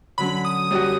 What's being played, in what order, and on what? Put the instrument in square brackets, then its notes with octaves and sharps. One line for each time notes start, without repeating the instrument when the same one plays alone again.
[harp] D3 F#3 C#4 [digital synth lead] B5
[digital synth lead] D#6
[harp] F#2 [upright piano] G3 F#4